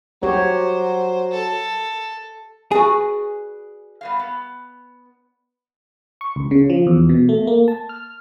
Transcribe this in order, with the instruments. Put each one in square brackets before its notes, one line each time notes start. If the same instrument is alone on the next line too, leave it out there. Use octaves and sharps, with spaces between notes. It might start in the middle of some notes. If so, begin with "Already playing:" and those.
[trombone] F#3 [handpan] G4 C#5 [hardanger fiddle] C5
[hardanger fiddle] A4
[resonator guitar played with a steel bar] F#4 B4 D5 [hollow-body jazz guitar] G#4
[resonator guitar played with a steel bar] G3 B3 F5
B3
[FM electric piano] C#6
C#2
C#3
F3
E2
B2
A3
A#3
A5
F6